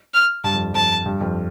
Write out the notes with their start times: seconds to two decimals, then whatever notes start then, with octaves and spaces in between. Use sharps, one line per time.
0.14 F6
0.44 G2 A5
0.54 F2
0.73 F2 A5
1.06 G2
1.21 F2